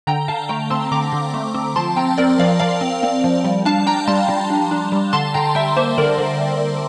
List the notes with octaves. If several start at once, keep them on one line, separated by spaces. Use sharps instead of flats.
D3 G5 A#5
D3 F5 A5
A3 G5 A#5
C4 A5 C6
D3 A#5 D6
D3
A3
C4
F3 A5 C6
C4 G5 A#5
C4 A#4 D5
F3 D5 F5
F3 D5 F5
C4
C4
F3
G3
D4 F5 A5
D4 G5 A#5
G3 A5 C6
G3
D4
D4
G3
D3 A5 C6
D3 G5 A#5
G3 E5 G5
A#3 C5 E5
D3 A#4 D5
D3